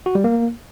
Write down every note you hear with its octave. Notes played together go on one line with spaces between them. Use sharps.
F#4
G3
A#3